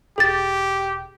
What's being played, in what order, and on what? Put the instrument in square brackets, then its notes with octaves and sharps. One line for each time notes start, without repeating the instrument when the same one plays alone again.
[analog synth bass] E1 [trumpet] G4 [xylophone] G#4 A6